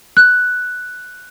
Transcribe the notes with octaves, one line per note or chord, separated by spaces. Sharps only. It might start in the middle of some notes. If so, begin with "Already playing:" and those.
F#6